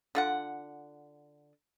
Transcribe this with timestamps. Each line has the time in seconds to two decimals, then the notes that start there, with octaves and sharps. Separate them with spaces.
0.15 D3 F4 F#5